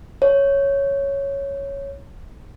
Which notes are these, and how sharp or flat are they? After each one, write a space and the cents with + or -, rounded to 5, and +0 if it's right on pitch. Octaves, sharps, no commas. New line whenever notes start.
C#5 +0